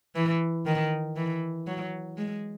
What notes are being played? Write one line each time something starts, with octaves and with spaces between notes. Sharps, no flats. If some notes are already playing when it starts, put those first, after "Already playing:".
E3
D#3
E3
F#3
G#3